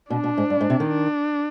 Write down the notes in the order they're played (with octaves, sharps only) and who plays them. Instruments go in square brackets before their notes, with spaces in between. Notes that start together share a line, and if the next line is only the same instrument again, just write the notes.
[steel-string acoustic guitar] B2 [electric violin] D4
[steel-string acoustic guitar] B2
G#2
G2
G#2
C3
D#3
[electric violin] D4